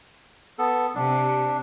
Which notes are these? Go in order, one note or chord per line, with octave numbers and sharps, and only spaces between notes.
B3 A4
C3 D4